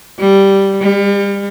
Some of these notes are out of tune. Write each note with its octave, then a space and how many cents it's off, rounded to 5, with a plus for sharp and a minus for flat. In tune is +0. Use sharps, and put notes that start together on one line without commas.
G3 -5
G3 +35